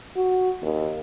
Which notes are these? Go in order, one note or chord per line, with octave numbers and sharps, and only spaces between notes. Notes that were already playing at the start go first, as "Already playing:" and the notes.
F#4
D#2